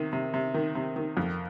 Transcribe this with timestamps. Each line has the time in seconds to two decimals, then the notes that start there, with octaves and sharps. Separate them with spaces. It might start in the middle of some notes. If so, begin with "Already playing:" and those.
Already playing: C3 D#3
0.13 C3
0.34 C3
0.54 D#3
0.75 C3
0.96 D#3
1.17 F2